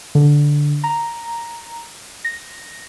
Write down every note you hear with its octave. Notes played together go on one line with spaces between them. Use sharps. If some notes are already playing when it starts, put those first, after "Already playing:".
D3
A#5
A#6